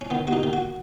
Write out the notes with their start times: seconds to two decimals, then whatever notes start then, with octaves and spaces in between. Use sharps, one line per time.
0.01 C#4
0.10 D#3 B3
0.27 D#2 F#4
0.33 D#4
0.43 D#3
0.53 F#4